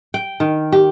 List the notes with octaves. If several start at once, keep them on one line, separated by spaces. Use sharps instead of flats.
G5
D#3
G4